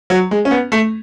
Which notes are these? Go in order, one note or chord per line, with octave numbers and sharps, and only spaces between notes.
F#3
G#3
C#4
B3
A3